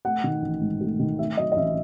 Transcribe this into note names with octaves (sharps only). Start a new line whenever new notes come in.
A3 F#5
D#3
A1
G#2
A3
D#3
A3 E5
F#3 D#5
D#5
A1 E5